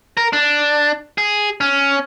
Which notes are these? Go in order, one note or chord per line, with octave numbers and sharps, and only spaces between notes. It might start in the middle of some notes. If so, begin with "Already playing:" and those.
A#4
D4
G#4
C#4